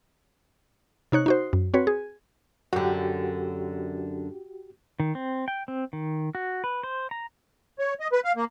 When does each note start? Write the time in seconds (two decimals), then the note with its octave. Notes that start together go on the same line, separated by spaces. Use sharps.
1.12 C3 D#4 C#5 F#6
1.26 D#4 F#4 C5
1.53 F#2
1.74 C4 F#4 B4 C#5
1.87 G#4
2.73 F#2 D3 F#4 G4
5.00 D#3
5.15 C4
5.48 G5
5.68 C4
5.93 D#3
6.35 F#4
6.64 B4
6.83 C5
7.11 A#5
7.79 C#5
8.00 D#5
8.12 B4
8.25 F5
8.36 A#3